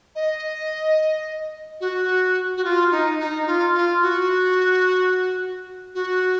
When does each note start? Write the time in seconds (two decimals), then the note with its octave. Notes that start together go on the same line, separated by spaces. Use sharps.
0.15 D#5
1.80 F#4
2.56 F#4
2.64 F4
2.91 D#4
3.18 D#4
3.46 F4
3.74 F4
4.01 F#4
5.94 F#4